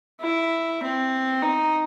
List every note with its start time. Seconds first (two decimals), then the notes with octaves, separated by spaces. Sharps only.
0.21 E4
0.82 C4
1.42 D#4